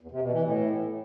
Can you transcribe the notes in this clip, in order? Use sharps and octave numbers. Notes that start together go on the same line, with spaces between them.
E2
C3
B2
E3
A2